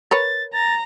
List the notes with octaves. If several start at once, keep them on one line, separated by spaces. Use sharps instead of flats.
A#4 B4 C#5 A6
A#5 A6